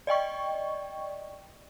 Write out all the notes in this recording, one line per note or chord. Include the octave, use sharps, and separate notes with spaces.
D5 D#5 G5 C#6